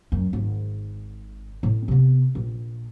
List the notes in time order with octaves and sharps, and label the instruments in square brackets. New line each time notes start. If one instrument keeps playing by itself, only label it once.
[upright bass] F#2
G#1
A2
C3 B3
A#1